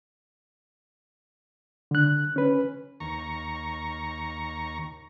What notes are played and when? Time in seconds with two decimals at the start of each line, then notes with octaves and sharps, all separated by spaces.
1.91 D3 F#6
2.36 C#4 B4
3.00 D#2 A#5 C#6